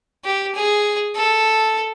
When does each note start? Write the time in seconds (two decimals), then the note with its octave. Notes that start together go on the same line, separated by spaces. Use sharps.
0.24 G4
0.55 G#4
1.15 A4